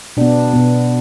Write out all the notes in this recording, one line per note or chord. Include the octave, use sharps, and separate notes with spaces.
B2 B3 D4
B2 B3